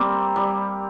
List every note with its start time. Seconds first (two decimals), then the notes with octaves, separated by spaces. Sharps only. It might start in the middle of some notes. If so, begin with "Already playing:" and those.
Already playing: G3 A#3 C4
0.36 G3